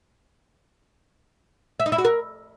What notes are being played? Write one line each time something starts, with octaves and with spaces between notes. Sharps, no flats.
E5
D#4
E4
F#4
A#4